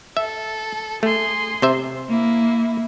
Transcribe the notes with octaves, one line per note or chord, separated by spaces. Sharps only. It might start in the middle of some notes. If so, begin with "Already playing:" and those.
A4 E5
A3 G#4 C6
C3 C5 E5
A#3 E4